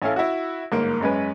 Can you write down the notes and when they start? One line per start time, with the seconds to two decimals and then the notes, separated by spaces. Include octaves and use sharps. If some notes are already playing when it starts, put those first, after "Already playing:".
0.02 A1 C#4 E4 A4 F5
0.16 E4 F#4
0.72 G1 G#2 A#3
1.01 F#2 G#3 C#4 B4